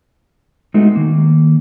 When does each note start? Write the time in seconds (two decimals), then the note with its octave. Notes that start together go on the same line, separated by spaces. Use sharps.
0.74 G#3 A3 B3 D#4 F#4
0.95 D#3 A#3